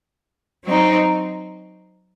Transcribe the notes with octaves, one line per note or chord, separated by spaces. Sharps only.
F#3 C4 D#4